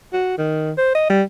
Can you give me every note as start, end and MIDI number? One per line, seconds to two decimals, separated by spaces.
0.13 0.34 66
0.38 0.71 51
0.78 0.92 72
0.95 1.09 75
1.09 1.23 55